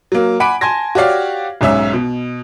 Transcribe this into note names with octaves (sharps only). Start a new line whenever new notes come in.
F#3 A#3
F#5 G#5 B5 D6 D7
G#5 A5 C6 G#6 A#6
F#4 G4 C#5 D5 F5
B1 G#2 C#4 E5 E6
B2